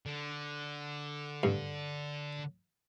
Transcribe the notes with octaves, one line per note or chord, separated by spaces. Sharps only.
D3
G2